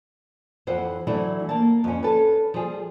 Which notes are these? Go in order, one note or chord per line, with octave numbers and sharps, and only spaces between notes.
F2 E3 C5 F#5
E3 F#3 A3 D4 E4
A#3 A5
F2 C#4
C#4 A4 B4
F3 G3 G#4